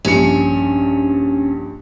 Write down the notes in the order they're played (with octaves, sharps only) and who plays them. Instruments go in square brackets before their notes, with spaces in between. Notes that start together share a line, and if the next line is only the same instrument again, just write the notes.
[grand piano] A#1 G2 C#7 [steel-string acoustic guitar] C#4